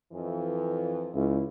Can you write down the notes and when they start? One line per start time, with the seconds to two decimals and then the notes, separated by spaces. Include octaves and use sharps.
0.12 F2 E3
1.15 C#2 E4